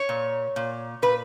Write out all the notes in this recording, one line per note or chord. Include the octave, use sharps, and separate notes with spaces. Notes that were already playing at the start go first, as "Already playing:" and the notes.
Already playing: C#5
A#2
A#2
A#2 B4